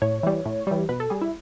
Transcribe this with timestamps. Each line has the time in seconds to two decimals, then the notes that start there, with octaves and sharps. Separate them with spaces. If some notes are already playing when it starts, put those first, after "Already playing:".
0.02 A2 C#5
0.23 E3 G3
0.46 A2
0.67 E3 G3
0.89 B2 B4
1.00 A4
1.10 G3 G#4
1.21 E4